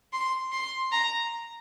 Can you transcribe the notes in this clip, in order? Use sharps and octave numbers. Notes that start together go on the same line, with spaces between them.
C6
C6
A#5